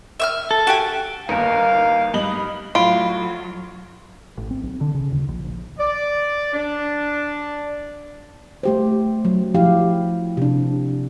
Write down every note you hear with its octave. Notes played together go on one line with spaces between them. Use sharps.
E5 E6 F6
A4
F#4 G4 G#5
G1 D#2 D#4 A#4 F5
G2 D#5 F#7
A2 F#3 F4 B5 D7
A1
C4
B1
D3
C#3
D#1
A#1
A#1
D5
D4
A3 G4 C5
F#3
F3 E4 G4 F5
C3 D4